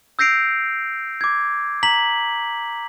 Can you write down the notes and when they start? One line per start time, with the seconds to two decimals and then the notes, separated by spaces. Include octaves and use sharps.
0.19 E6 G6 A#6 C7 D7 F7
1.21 D6 G#6
1.83 A#5 B6 F#7